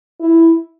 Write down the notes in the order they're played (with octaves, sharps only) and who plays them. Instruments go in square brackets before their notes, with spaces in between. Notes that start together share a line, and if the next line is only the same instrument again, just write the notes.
[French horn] E4